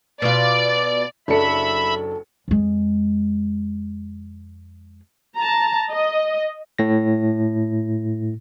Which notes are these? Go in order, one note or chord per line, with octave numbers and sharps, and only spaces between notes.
B2 F4 D5
F#1 F#3 D4 A4 E5 B5 C#7
F2 G#3
A5 A#5
D#5
A2 A#6